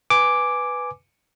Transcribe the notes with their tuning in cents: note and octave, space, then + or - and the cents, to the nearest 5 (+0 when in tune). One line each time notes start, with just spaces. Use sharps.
B4 +0 G#5 +0 D6 +0